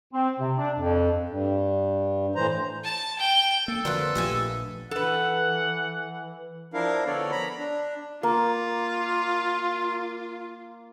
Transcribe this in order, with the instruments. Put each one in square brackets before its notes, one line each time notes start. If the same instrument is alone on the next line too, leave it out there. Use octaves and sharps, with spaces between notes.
[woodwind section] C4
C3
D4
F2
[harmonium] G2
A2 E3 C5 A#5
[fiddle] A5
G5
[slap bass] A#3 [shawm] A4
[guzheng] F2 F4 B4 [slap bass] D3 F3 [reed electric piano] F#4 A#4 D5
[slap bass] A#1 [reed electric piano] A3 F4 G4 [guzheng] D#5 E5 G#5
[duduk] E3 [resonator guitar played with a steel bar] A4 B4 [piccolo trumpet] F#5
[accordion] F3 D4 E4 A#4 F5
D3 F3 B3 A4 C#5 D5
A#5 B5
D4
[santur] A#3 [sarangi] F4